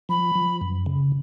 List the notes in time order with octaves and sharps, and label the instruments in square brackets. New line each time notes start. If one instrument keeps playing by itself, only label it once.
[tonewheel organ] F3 [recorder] B5
[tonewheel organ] F3
F#2
C#3